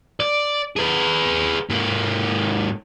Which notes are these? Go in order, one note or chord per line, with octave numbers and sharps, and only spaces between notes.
D5
G#4 B4
G#2 A#3